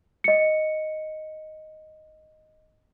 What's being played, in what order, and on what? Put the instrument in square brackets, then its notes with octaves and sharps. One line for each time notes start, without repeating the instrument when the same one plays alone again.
[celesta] D#5 C#7